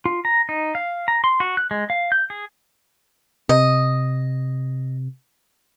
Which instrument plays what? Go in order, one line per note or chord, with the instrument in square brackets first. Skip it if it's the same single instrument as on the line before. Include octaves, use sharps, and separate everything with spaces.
[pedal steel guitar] F4
A#5
D#4
F5
A#5
C6
F#4
F#6
G#3
F5
G6
G#4
[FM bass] C3 [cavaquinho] D#5